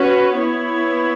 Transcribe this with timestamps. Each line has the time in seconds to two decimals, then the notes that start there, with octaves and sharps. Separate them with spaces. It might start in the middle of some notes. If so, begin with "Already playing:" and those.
Already playing: C#4 F#4 B4
0.38 B3 E4 C#5